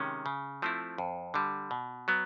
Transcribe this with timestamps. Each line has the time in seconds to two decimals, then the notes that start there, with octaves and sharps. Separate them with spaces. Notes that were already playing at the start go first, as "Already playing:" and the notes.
Already playing: C3 D#3 G#3 C#4
0.26 C#3
0.62 F3 A3 C4 E4
0.98 F2
1.34 D3 G3
1.71 B2
2.08 F#3 B3